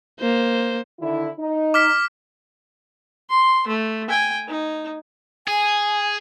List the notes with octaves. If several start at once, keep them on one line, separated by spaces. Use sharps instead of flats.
A#3 C5
D3 D#3 E4
D#4
D6 F6 B6
C6
A3
G5 G#5
D#4
G#4 G#5